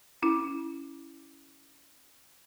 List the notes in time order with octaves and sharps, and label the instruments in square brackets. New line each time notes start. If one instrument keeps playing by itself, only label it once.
[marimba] C#4 E4